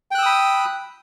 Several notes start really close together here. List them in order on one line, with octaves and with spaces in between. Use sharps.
G5 F#6 E6 D#6 B5